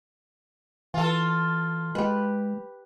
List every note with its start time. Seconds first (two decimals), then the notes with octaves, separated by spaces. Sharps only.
0.94 E3 F4 A4
1.95 G#3 G4 B4